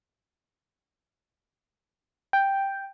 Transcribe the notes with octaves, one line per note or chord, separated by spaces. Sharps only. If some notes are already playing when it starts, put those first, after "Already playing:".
G5